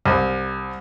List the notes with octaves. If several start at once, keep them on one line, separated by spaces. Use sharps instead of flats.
C2